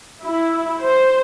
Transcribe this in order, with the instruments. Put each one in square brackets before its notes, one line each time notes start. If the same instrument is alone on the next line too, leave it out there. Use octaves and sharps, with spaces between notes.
[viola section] E4
C5